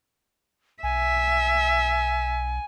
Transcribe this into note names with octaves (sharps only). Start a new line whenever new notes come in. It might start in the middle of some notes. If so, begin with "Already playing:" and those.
B1 E5 G#5